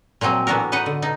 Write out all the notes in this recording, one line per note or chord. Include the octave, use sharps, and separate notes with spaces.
A#2 F3 F#3 C4 D#5
A2 E3 B3 D4 F#4 A#4
D#4 B4 D#5 F#5
D3
B2 D#4